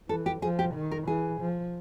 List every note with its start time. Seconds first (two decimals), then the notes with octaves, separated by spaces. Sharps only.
0.09 E3 A4
0.26 G4
0.42 F3 G#4
0.59 G4
0.75 D#3
0.91 A#4
1.07 E3 G#4
1.41 F3